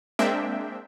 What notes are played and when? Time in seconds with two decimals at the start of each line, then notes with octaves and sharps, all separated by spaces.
0.19 G#3 A#3 C4 D4 E5 G5